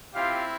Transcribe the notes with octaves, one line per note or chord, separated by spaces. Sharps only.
C4 E4 F4 G4 F5